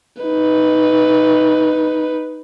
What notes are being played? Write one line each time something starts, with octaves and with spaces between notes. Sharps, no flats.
D#4 B4